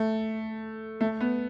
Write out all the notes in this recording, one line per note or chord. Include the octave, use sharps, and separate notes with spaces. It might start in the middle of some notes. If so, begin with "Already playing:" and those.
Already playing: A3
A3
B3